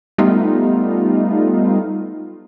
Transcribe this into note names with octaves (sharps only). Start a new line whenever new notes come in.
G3 A3 B3 D#4 F4